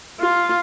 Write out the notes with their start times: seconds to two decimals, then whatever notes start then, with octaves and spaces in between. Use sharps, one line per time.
0.20 F4